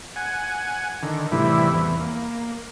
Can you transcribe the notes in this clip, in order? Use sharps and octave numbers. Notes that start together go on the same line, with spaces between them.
F#5 G#5
D3 D#3
A2 C3 E3 G3 E4
E2
A#3